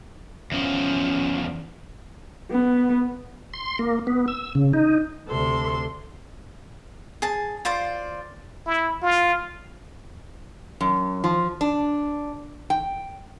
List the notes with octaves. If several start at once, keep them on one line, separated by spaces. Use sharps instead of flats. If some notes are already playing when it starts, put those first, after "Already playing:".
E2 F3 C#4
B3
C6
A#3
B3
E6
C#3
D#4
D2 C3 A4 C6
G#4 A5
F4 C5 D5 F5
E4
F4
F#2
F3
D4
G5